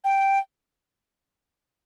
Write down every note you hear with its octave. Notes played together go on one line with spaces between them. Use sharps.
G5